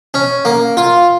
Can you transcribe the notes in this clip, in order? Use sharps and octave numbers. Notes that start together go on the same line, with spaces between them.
C#4
A#3
F4